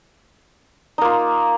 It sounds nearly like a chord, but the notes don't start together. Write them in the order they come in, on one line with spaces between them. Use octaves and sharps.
D#4 A#3 F4